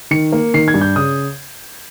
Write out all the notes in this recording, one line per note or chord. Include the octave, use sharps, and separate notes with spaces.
D#3 C#7
A#3
D#3 C7
G#6
G2
G6
C#3 D#6